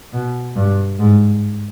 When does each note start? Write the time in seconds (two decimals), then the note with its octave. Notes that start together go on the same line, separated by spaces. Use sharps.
0.13 B2
0.56 G2
0.99 G#2